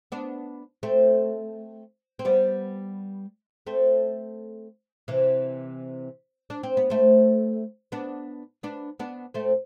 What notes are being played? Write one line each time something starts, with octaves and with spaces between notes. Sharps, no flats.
B3 D4
A3 C4
C4
G3 B3
A3 C4
C3 E3
D4
C4
B3
A3 C4
B3 D4
B3 D4
B3 D4
A3 C4